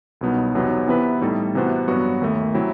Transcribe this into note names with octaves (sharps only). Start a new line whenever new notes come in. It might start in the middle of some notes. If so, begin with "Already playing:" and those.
C2 B2 F#3 B3 D#4
E2 C3 F#3 B3 D#4
C3 E3 B3 E4 B4
A2 G3 D#4 A4
C3 E3 B3 F#4 C5
G2 F#3 B3 F#4
D#2 D#3 A3
C3 F#3 C4 E4